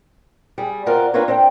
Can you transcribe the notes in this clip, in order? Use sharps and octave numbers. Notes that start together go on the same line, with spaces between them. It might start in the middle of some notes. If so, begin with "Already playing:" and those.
G3 G#4
B2 B3 C4 F4 A#4 D5
C4 D4 F4 A#4 B4 C#5
C4 D4 D5 G5